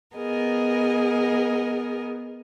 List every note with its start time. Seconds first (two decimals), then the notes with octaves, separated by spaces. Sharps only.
0.15 B3 G#4 A#4 D#5